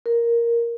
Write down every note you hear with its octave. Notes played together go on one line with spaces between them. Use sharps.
A#4